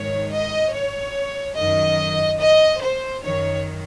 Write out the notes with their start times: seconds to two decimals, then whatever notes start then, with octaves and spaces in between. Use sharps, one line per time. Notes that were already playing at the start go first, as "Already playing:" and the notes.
Already playing: G#2 D#3 C#5
0.33 D#5
0.74 C#5
1.56 F#2 D#3 D#5
2.39 D#5
2.81 C5
3.23 F#2 D#3 C#5